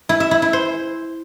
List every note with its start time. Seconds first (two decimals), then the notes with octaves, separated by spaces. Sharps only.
0.09 E4
0.20 E5
0.31 E4
0.42 E4
0.53 C5